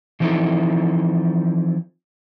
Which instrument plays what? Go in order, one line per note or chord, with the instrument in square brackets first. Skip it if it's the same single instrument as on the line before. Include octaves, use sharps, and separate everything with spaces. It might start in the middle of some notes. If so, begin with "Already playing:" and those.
[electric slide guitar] E3 F3 C4 D#4 E4 A4